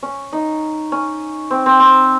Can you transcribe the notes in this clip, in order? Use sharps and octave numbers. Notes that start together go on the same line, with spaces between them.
C#4
D#4
C#4
C4
C4
C4